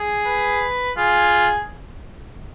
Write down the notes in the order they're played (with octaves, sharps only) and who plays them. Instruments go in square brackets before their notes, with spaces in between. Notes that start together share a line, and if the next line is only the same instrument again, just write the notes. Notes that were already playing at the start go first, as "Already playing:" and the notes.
Already playing: [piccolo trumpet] G#4
[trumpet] B4
[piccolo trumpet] F4 [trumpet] G#4